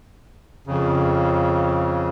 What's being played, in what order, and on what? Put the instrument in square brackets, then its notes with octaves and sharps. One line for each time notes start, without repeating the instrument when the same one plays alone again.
[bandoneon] F2 C#3